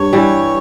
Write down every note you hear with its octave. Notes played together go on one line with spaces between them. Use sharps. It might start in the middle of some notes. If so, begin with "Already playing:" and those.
Already playing: G2 C#5
E3 G3